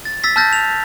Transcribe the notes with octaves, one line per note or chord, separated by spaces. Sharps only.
A6
E6 A6 B6
A5 E6 F6 G6 A6 A#6
F7